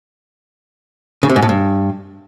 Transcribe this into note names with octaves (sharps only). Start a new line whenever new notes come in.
C#3
C3
G#2
A2
G2